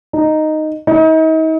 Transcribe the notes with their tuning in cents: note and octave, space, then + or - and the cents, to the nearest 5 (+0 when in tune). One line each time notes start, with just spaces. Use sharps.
D#4 -5
D#4 +40